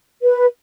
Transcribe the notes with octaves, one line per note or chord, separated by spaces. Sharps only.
B4